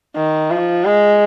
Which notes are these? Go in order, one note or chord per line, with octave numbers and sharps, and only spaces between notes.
D#3
F3
G#3